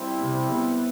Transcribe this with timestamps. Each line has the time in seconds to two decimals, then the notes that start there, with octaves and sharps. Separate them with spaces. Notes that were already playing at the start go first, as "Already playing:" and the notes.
Already playing: G3 C4 E4
0.19 C3
0.50 B3